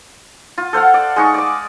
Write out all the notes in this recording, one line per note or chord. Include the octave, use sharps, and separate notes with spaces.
F4
A4 C5 F5 F#5
D5
G#3 D#4 C#6
D5 D6